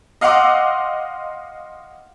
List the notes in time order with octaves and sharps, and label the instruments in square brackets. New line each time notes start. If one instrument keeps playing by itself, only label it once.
[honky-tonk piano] D#5 F5 F#5 C6 D6 E6